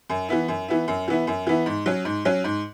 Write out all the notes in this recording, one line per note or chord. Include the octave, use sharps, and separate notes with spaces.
F#2
E3 B3 E4
F#2
E3 B3 E4
F#2
E3 B3 E4
F#2
E3 B3 E4
G#2
F#3 C#4
G#2
F#3 C#4
G#2